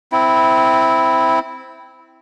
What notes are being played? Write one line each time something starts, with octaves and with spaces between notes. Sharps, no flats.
C4 E4